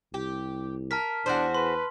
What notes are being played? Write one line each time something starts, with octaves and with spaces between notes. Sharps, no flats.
C2 G4
A#4 A5 F6 B6
E2 D4 F#4 G#4 C5
B4 C6